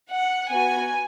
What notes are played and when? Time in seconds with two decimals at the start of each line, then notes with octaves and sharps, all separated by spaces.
0.09 F#5
0.51 B3 F#4 G#5